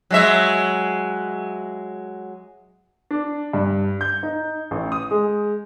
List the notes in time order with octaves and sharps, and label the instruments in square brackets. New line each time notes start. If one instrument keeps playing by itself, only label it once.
[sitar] F#3 G#3 E5
[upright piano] D4
G2
G6
D#4
A1
D#6
G#3